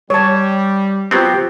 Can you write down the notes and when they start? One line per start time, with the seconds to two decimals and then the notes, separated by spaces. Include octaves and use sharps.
0.10 G3 C#5 A5
1.11 F#3 B3 C4 F4 G4 C5